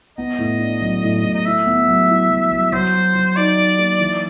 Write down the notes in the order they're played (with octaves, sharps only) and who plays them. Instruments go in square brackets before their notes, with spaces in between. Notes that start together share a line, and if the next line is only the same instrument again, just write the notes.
[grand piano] B3 [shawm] D#5
[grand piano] A2
D4
F#3
A2
A2
[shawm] D#5
[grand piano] E4 [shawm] E5
[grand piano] B3
F#3
E4
F#3
F#3
[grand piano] F#3 [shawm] C5
[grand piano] F#4
F#3
[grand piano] D#4 [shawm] D5
[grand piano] D#4
A#3
E3